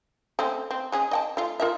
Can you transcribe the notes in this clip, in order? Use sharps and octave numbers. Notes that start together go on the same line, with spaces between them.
A3 C4 C#4
C4
G#3 C#4 G#4
D#5 G5 A5
A3 F4
F4 A#4 E5